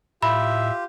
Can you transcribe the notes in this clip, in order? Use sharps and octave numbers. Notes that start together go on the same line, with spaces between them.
A2 F4 G4 E5 B5